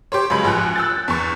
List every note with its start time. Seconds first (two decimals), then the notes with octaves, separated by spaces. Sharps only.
0.12 G4 C5 C#5
0.30 C#2 F#3 G#3 B5
0.44 A1 F3 G#5 F#6
0.76 E6 F#6 G6 A6
1.08 E2 C#6